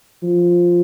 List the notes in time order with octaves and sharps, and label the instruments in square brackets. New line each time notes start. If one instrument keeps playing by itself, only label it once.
[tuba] F3